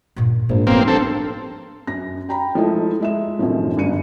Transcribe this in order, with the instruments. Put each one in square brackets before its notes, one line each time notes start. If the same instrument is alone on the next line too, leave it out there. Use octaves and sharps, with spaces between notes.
[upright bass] G2 A#2
[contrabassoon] A#1 [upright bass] G#2
[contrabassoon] B1 [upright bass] F3 D4 [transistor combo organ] A#3 C4
[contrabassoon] G2 [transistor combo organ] C4 A4
[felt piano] F#2 A#6
G5 A#5 B5
F3 G#3 A3 E4 A4 E5
G#3 E5 E7
F#2 A2 C3 D#3 F3
G1 F#2 D3 C#7 D#7